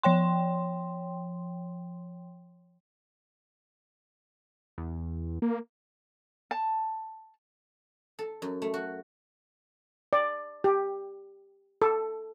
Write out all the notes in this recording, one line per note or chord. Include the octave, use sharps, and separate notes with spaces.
F3 C#5 G5 C6
E2
A#3
A5
A4
F#2
A3
F#4
D5
G4
A4